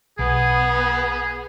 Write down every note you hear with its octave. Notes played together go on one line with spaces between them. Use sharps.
B1 B3 G#4